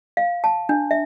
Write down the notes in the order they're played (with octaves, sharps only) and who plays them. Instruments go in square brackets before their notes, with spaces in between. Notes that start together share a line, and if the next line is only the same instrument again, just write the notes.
[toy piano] F5
A5
D4
E5